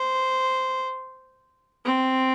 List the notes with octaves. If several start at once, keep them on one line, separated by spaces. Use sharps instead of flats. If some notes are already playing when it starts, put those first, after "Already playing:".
Already playing: C5
C4